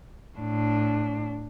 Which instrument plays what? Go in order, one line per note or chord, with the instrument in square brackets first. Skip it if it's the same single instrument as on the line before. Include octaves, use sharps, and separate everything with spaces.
[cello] A2 D4